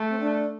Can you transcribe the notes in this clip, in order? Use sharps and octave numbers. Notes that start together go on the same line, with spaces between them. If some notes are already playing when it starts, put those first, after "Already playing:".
Already playing: A3
C4
D4